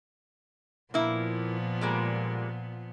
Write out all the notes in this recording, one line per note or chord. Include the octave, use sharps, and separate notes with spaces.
A#2 F3 A#3 B3 E4
G3 G#3 A#3